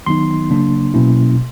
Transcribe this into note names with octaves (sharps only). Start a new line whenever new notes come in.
D#3 F#3 B3 D#4 C6
C#3 F#3 A#3 D4
B2 F#3 A#3 C#4 E4